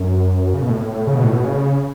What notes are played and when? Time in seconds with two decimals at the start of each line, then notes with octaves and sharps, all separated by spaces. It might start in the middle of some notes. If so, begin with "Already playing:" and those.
Already playing: F#2
0.54 C#3
0.62 B2
0.69 A2
1.07 C#3
1.15 B2
1.24 A2
1.32 B2
1.44 C#3